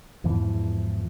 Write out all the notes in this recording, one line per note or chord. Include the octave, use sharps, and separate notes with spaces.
E2 G#2 E3 F3